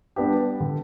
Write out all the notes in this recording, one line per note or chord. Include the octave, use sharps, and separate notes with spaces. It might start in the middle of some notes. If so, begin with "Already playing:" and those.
G3 B3 D4 G4
D3